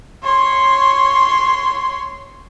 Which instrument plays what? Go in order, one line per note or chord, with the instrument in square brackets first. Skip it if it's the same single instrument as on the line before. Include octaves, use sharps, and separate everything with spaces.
[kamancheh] C#5 C6